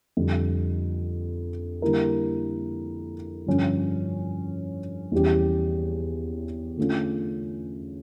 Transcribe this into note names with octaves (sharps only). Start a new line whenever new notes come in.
F2 D3 G3
D3 G3 A#3 E4 A#4
G2 D3 F3 C#4
E2 E3 G3 C#4 G4
D3 A3 C#4 F4